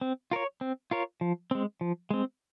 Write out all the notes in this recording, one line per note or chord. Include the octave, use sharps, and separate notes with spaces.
C4
F4 A#4 C#5
C4
F4 A#4 C#5
F3
G#3 C4
F3
G#3 C4